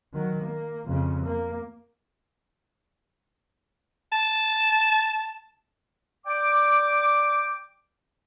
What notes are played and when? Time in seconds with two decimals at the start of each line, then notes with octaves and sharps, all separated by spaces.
0.14 D#3 F#3
0.44 A#3
0.86 F2 C#3
1.26 A#3
4.12 A5
6.26 D5 G5 D6